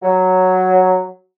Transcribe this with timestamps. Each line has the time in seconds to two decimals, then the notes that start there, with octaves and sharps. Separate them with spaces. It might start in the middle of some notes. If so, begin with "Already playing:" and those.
0.03 F#3